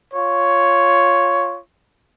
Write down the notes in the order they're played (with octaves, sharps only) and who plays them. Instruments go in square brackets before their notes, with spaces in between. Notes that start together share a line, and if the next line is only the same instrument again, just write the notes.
[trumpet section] F4 C#5